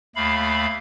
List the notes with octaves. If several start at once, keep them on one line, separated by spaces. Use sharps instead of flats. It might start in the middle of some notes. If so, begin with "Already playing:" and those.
D#2 A3 F5 B5